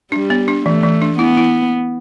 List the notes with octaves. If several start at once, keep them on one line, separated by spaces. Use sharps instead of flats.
G3 D4
B3
D4
E3 A3
E3
D4
B3 E4
E4